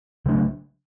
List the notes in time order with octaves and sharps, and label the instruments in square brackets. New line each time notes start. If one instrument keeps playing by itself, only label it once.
[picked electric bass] C#3 F#3 A3 D4